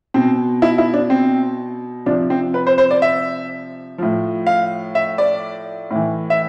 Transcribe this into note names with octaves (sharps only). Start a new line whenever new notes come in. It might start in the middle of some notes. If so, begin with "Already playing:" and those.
B2 C4
E4
E4
D4
C4
C3 F3 D4
C4
B4
C5
C5
D5
E5
A2 F3
F5
E5
D5
A2 E3
E5